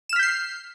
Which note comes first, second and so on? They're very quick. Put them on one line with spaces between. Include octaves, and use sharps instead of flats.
E7 F6 B6 G6 C7